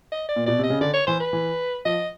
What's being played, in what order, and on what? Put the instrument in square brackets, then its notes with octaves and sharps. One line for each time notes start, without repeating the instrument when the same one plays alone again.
[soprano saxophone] D#5
D5
[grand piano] A#2
[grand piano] B2 [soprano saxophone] D5
[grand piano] C3 [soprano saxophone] D#5
[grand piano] C#3
[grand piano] D3 [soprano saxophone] D5
[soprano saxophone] C#5
[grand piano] E3 [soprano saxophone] C5
[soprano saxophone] B4
[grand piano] E3
[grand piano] F3 [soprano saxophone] D#5